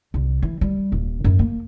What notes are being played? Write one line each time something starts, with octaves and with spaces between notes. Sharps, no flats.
C2
E3
G3
D#1
F#2
A#3